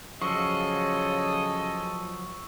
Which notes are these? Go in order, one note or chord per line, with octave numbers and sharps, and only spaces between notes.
C#3 F3 F#3 G#4 A4 D#5 C#6 E6